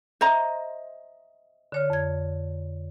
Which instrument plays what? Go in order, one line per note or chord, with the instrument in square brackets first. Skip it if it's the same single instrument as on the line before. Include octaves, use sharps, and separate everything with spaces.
[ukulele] C5 D#5 A#5 [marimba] E5
[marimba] D3 C#5 F6
F2 G#6